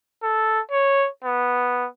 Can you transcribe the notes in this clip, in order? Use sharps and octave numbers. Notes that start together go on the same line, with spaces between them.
A4
C#5
B3